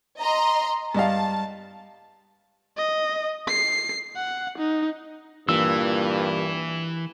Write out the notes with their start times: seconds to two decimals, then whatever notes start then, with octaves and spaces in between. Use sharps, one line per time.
0.19 D#5 A#5 C6
0.95 G2 D#5 F5 A5
2.77 D#5
3.48 C7
4.16 F#5
4.58 D#4
5.49 G2 A#2 E3 E6